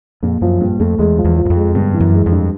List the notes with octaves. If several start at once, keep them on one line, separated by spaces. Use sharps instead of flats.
A#1 F2
F#2 F3
A#1 G2
F2 A3
E2 G#3
F3
E2
F3
F#2
F2
G#3
G1 G2
E3
F#2
G#3
F2
G2